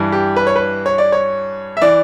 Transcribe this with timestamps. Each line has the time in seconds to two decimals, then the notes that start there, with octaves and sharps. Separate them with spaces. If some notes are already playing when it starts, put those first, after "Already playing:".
Already playing: G2 E3
0.12 G4
0.36 B4
0.47 C#5
0.56 B4
0.86 C#5
0.98 D5
1.12 C#5
1.77 E5
1.82 E3 D5